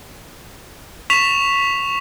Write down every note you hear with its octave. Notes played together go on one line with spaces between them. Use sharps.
C#6 B6 E7 F7